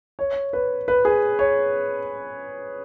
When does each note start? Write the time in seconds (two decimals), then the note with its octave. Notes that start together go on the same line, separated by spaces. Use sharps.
0.19 C#5
0.53 B4
0.88 B4
1.05 G#4
1.39 C#5